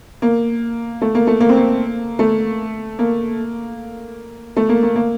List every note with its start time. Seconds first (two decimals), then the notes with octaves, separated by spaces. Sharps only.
0.22 A#3
1.02 A3
1.15 A#3
1.27 A3
1.40 A#3
1.49 C4
1.57 A#3
2.19 A3
2.99 A#3
4.57 A3
4.69 A#3
4.83 A#3
4.96 A#3